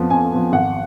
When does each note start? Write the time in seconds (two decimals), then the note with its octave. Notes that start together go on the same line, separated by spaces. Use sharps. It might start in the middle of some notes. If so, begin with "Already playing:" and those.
Already playing: F2 F3 B3
0.10 F2 G#5
0.32 F3 B3
0.52 G#1 F#5